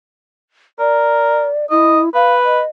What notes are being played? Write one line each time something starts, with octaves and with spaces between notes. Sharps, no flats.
A#4 D5
E4 D#5
B4 F5
D#5